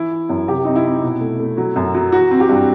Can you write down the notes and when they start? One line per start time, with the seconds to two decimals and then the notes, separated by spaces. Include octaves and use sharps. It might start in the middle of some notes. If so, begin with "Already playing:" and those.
Already playing: E3 E4
0.11 E3
0.29 F#2
0.48 C3 G4
0.65 C4 D#4
0.76 E4
0.84 C4
1.03 B2
1.21 A3
1.39 A3
1.57 F#3
1.76 F#2
1.94 F#3
2.12 E3 F#4
2.31 C4
2.40 G4
2.49 G2